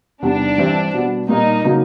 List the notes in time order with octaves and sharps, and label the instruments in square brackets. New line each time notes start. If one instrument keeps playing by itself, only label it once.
[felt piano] E2 C3 D#3 G3 B3 [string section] D4
[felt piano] G2 E3 G3 C4
B2 G3 B3
[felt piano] A#2 G3 A#3 [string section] D#4
[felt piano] C#3 F#3 A#3 D#4 F#4